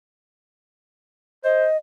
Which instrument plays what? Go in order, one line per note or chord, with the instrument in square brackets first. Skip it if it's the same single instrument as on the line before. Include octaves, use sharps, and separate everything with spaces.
[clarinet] C5 [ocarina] D#5